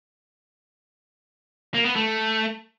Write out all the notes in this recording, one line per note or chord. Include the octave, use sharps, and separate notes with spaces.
A#3
B3
A3